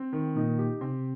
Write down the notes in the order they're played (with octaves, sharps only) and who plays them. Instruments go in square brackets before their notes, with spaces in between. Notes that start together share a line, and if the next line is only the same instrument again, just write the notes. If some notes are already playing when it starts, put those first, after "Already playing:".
Already playing: [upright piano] C4
D#3
[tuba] A#2 [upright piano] D#4
[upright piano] G4
[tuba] C3 [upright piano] C4